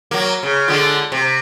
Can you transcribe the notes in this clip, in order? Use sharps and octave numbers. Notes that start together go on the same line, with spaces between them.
F#3 A#3
C#3
D3 G#3 F4
C3